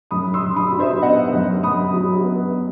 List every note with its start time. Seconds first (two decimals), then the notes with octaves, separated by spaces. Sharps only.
0.11 F#2 B5 D#6
0.34 C6 E6
0.42 F#2
0.56 B5 D#6
0.72 F#3
0.79 C5 E5
1.02 B3 D#5 F#5
1.33 F#2
1.63 F#2 B5 D#6
1.94 F#3
2.24 B3